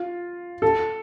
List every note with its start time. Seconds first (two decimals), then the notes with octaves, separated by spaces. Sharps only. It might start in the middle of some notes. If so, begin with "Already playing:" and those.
Already playing: F4
0.62 A4